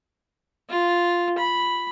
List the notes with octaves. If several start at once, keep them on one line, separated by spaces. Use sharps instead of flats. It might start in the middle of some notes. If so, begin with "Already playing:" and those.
F4
B5